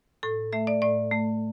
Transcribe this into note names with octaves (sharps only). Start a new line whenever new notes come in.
A2 A4
A3 E5
D5
A2 D5
A3